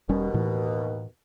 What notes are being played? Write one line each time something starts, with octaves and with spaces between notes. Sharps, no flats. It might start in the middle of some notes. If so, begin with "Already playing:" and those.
E1 D#2 B2 G3 C#4
A2 E3